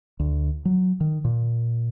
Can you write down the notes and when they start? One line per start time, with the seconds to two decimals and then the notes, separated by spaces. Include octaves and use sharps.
0.20 D2
0.65 F#3
1.00 D#3
1.25 A#2